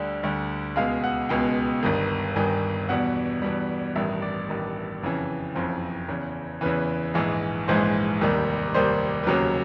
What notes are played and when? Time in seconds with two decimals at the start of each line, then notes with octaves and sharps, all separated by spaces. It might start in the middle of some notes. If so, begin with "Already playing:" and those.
Already playing: D2 D3 G3
0.23 D2 D3 G3
0.76 C#2 B2 G#3 F5
1.04 F#5
1.29 C#2 B2 G#3 G5
1.83 G1 G2 D#3
2.36 G1 G2 D#3 G#5
2.89 E2 B2 G3 F#5
3.42 E2 B2 G3
3.95 A1 G2 D#3 E5
4.22 D5
4.49 A1 G2 D#3
5.02 F#1 F2 C#3 E3
5.55 F#1 F2 C#3 E3 C5
6.08 E2 C#3 E3
6.61 E2 C#3 E3 B4
7.14 A#1 G#2 E3 G#3
7.68 A#1 G#2 E3 G#3 C5
8.21 F1 D#2 D#3 G3
8.74 F1 D#2 D#3 G3 C5
9.24 B4
9.27 F1 D#2 C#3 F#3 A#4